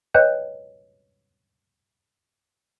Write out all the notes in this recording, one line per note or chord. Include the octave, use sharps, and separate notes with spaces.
B4 C#5 D#5 G5 F#6 G6